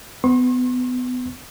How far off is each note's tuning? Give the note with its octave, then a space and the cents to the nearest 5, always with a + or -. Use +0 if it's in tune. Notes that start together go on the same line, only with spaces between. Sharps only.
B3 +25 C6 +45